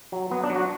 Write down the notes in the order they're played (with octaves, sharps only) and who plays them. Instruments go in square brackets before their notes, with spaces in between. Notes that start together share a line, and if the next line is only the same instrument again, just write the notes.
[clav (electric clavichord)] F#3
F#3 B3
D4
F#3
F#4